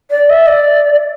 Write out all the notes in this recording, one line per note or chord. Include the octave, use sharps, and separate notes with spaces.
D5
E5
D5